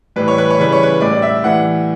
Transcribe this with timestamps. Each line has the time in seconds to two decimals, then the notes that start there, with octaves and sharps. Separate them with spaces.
0.16 A2 E3 G3 B4
0.28 C#5
0.38 B4
0.50 C#5
0.58 C#3 E3 G3 B4
0.72 C#5
0.83 B4
1.01 A2 G3 D5
1.13 D5
1.22 E5
1.44 A2 E3 G3 F#5